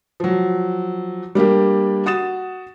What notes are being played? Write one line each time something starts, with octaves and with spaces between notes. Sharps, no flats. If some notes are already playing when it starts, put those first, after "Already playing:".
F3 F#3
G3 A#3 D4 G4
F#4 D#6 A6 E7